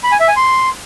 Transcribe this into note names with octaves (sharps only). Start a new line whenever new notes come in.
B5
G#5
E5
G#5
C6